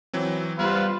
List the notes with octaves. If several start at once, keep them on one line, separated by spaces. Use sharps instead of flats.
E3 F#3 C4
G3 B3 F4 B4 C5